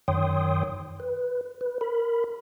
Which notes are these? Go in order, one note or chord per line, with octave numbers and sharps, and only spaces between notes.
F#2 D#3 C#5 G5 C6 D#6
B4
B4
A#4 B5